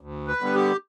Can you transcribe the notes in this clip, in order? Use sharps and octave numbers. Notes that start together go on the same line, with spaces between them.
D2
B4
D3 G3 B3
G4